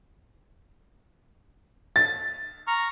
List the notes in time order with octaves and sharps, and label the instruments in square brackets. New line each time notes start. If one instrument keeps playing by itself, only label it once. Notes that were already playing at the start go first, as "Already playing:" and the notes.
[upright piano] A6
[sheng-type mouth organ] A#5 C#6 F6